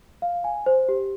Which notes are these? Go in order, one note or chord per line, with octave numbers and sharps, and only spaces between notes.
F5
G#5
C5
G4